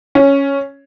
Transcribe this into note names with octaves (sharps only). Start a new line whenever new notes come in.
C#4